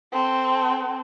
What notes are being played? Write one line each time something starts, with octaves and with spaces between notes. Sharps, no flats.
C4 A4